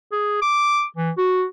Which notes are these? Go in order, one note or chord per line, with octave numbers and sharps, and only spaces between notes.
G#4
D6
E3
F#4